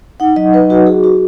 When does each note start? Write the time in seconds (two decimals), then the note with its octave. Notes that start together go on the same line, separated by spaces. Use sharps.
0.20 D#4 F#5
0.36 F#3 D#5
0.53 D#4 B4
0.70 D#4 F#4
0.86 F#4 G#4
1.04 F#4